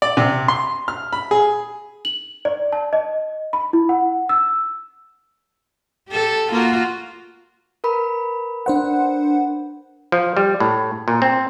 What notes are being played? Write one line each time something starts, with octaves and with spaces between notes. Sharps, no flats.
D5
C3
C6
F6
B5
G#4
F#7
D5
A5
D#5
B5
E4
F#5
E6
G4 A4
A#3 F4 F#4
A#4 B4 B5
D4 C5 F#5
F3
G3
A2
A#2
C4